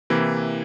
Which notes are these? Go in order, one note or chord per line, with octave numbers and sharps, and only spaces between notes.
C3 E3 A#3 E4